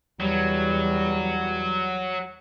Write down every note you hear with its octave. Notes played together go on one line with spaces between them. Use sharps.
E2 F#3 G3